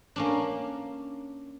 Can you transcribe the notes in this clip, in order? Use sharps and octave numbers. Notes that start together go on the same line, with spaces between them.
A#3 C#4 D4